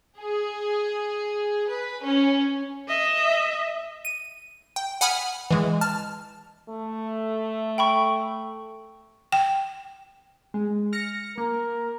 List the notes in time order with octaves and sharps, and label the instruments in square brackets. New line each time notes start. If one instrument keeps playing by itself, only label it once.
[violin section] G#4
B4
C#4
[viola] D#5 E5
[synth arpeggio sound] D#7
G5
F#5 G#5 B5 D#6 F6
E3 G#3
A5 F6
[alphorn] A3
[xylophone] G5 B5 C#6
[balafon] G5
[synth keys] G#3
F6 A#6 C#7
[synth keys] A#3 [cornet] A#4